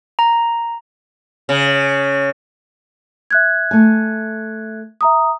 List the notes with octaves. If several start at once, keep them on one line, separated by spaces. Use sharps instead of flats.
A#5
C#3
E5 F#6 G#6
A3 G#5
E5 A#5 D#6